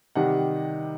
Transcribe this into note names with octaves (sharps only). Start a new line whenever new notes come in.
C3 D#3 G3 F#5